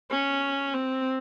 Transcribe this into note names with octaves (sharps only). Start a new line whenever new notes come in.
C#4
C4